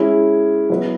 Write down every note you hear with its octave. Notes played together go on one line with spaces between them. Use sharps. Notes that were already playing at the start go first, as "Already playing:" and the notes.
Already playing: G#3 C#4 E4
F#3 B3 E4 B4